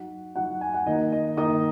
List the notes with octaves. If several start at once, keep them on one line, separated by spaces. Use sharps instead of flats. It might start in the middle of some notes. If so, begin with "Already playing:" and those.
Already playing: F#3 D#4 F#4 F#5
F#3 D#4 F#4 F#5
G#5
F#5
D#3 A#3 D#4 D#5
D#5
D#3 A#3 D#4 D#5 D#6